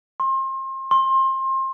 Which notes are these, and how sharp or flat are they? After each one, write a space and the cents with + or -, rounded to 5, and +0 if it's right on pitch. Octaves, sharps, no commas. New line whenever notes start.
C6 +35
C6 +30